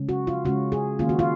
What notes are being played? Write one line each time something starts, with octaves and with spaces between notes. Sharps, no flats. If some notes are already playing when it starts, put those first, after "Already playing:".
Already playing: C#3 G#3 C#4
F#4
F4
C#3 G#3 C#4 F#4
G#4
D#3 A#3 C#4 F4
F#4
F4